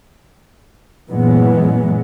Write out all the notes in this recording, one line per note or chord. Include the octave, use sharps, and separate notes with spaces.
F#2 A#2 E3 G#3 B3